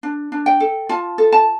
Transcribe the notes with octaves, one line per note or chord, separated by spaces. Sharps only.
D4
D4
G5
A4
F4 A5
A4
A5